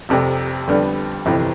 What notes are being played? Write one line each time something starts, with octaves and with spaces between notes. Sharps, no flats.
F1 F2 C3
F2 D3 G3 B3
G1 F2 C3 E3